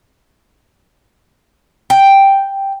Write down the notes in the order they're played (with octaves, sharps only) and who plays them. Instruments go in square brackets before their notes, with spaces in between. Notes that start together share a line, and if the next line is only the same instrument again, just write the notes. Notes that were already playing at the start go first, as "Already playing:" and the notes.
[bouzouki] G5